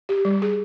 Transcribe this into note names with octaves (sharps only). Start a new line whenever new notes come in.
G4
G3
G#4